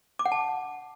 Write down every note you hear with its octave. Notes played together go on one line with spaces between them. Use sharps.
D6
F#5
A5